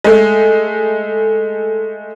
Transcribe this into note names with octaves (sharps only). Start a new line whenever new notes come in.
G#3 A3